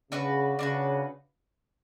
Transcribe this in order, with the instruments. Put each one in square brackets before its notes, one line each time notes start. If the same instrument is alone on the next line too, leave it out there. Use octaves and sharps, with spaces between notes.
[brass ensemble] C#3 [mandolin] D4 F#4 B4
[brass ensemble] C#3 [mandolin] D4 F#4 B4